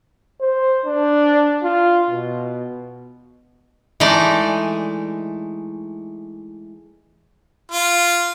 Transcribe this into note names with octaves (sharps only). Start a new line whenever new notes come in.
C5
D4
F4
B2
E3 G#3 A3 D#4 D5
F4